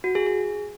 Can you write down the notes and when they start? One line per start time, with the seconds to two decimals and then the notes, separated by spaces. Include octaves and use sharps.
0.04 F#4
0.15 G#4
0.27 G#4